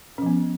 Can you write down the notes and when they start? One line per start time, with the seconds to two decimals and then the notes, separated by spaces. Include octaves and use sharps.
0.18 C#4
0.22 F3
0.26 B3